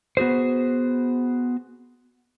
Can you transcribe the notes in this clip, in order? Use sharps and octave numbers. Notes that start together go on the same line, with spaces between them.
B3 F#4 G#4 C5